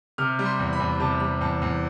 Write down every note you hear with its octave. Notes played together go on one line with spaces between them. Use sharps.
C3 F6
G3
C6
E2
B5
E2
C3 A5
G3
E2 A5
E2